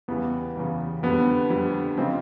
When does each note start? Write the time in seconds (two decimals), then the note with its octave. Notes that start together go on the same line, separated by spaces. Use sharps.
0.08 E2 C#3 E3 G3 B3
0.55 E2 C#3 E3 G3
1.03 F2 D3 G3 B3
1.50 F2 D3 G3
1.97 C#3 F3 G#3 C4